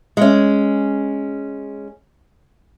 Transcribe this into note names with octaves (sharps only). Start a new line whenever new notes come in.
G#3 C#4